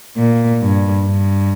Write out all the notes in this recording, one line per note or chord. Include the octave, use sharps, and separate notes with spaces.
A#2
G2
G2